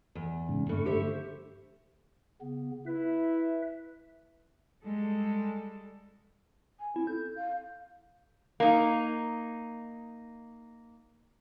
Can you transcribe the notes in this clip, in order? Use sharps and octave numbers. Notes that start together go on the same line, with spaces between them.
E2
G#2 C#3
G2 D3 A3 C#6
G4 C5 E5
C#3 B3
E4 B4 E5
G3 G#3 A4
G#5
C4 E4
A4 G6
F5
A#3 D#4